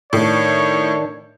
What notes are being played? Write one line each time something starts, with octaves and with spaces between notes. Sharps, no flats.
A2 D#3 D4 C#5